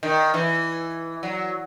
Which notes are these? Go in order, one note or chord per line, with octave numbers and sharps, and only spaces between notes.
D#3
E3
F#3